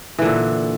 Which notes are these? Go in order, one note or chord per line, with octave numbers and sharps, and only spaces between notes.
A#2 D3 E3